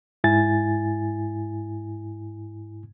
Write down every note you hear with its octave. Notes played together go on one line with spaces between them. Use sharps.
G#2 E4 G#5 A6